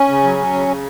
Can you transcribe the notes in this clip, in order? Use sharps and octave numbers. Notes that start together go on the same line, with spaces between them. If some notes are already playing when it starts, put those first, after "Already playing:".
Already playing: C#4
C#3
F#3
F#3
C#3
C#3